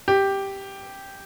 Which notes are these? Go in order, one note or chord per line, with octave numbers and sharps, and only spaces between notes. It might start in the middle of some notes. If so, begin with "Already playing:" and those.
G4